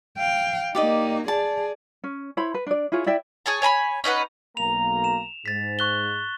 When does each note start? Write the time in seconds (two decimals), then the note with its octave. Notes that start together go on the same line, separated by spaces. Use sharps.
0.18 F5 G5
0.75 A#3 D#4 G4 D5 D#5
1.28 G#4 D5 A5
2.04 C#4
2.37 E4 C5 C#5 B5
2.54 B4
2.66 D4 D5
2.92 E4 F4 G#4 C#5
3.06 E4 D5 E5 G5
3.46 G#4 C#5 G#5 A5
3.62 C#5 G#5 A#5 B5
4.04 C#4 D#4 B4 F#5
4.57 B1 A#3 A#5 F7
5.04 E7
5.46 G#2 A6 B6
5.79 C#6 F#6 G7